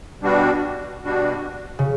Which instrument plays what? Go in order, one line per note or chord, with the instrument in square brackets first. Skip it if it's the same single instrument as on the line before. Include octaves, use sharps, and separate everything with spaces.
[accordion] B2 G3 D4 F#4
B2 G3 D4 F#4
[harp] C#3